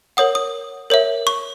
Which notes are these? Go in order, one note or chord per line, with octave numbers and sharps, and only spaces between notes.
A#4 C#5 F#5 D#6
D#6
A#4 C#5 E5
C#6